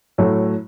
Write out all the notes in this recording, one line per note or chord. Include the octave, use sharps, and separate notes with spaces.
A2 F#3 A3